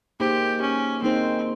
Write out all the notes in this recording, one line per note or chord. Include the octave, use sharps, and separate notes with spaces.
A#3 D#4 G4 G#4 C5
C#4
A#3 C4 D#4 G#4 C5